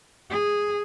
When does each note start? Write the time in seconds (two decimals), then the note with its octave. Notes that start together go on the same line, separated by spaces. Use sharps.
0.30 G#4